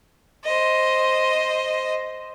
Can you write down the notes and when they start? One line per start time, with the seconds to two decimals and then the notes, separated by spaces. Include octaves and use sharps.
0.44 C5 D#5